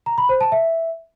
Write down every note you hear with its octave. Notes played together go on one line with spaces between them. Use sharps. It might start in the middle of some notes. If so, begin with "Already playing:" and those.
A#5
B5
C5
A5
E5